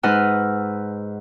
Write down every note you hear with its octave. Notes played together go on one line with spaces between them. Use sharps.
G#2 D#4 B4 F#5 E6 F6